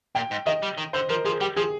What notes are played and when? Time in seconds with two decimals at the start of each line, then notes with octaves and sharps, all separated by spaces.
0.15 A#2 G5
0.31 G#2
0.46 D#3 D#5
0.63 G3
0.78 D#3
0.93 D3 C5
1.09 F3 A#4
1.25 F3 G#4
1.41 G3 G4
1.56 F3 G#4